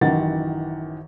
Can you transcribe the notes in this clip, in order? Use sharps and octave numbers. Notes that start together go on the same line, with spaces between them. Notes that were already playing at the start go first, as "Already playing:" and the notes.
A1 F#2 D#3 E3 F#5 A6